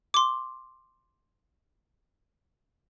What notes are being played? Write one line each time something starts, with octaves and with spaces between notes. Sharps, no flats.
C6 D6